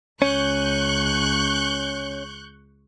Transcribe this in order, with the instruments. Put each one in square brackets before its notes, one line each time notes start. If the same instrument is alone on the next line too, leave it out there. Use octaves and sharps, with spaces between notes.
[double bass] C#2 [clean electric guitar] C#4 [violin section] C#6 F#6 G6